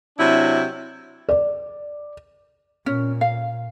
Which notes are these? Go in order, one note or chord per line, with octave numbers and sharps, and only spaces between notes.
C3 F#3 D4 E4
D5
A#2 C#4
F5